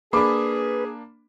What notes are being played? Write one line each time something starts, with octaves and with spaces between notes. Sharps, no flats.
A#3 D4 G#4 B4 B5 D6